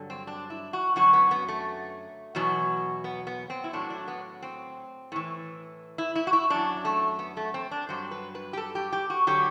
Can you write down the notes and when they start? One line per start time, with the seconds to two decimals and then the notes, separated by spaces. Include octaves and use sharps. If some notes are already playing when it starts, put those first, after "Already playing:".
Already playing: G2 D3 F#3
0.10 C4
0.27 D4
0.50 E4
0.73 F#4
0.96 F#2 D3 F#3 F#4
1.13 B3
1.31 B3
1.48 A3
2.35 E2 B2 F#3
3.04 B3
3.27 B3
3.50 C4
3.64 E4
3.73 A2 F#3 D4
3.90 D4
4.08 B3
4.42 C4
5.12 A2 E3
5.98 E4
6.15 E4
6.27 F#4
6.33 E4
6.50 F#2 F#3 D4
6.85 A3
7.19 B3
7.37 A3
7.54 C4
7.71 D4
7.89 G2 F#3 C5
8.11 B4
8.35 B4
8.53 G4
8.57 A4
8.75 G4
8.93 G4
9.10 F#4
9.27 D3 F#3 G4